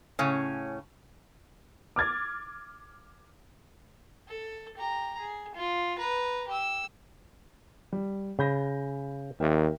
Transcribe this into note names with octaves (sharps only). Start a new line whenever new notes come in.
A2 C#3 C#4
D6 F6 G#6 A6
A4
G4 A#5
G#4
F4
B4 A#5
G4 E6
G3
C#3 B5 G6 A#6
D#2 A#4 E5 G5